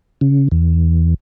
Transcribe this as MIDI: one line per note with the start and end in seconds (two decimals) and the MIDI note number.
0.21 0.48 49
0.52 1.14 40